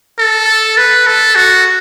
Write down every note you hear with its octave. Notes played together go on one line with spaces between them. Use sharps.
A4
B4
A4
F#4